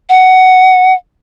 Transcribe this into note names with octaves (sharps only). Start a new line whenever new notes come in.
F#5